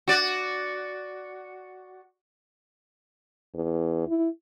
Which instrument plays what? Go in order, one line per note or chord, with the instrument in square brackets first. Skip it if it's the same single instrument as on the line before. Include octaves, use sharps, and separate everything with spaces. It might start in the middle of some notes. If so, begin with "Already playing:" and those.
[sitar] F#4 D5
[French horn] E2
E4